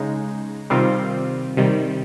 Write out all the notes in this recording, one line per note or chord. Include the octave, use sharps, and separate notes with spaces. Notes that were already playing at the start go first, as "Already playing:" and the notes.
Already playing: C#3 G#3 D#4
C3 D#3 G3 C4 F4
C3 D#3 G3